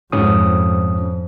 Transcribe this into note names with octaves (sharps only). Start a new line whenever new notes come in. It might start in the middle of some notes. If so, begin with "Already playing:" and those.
F2 G#2 C#4 D#6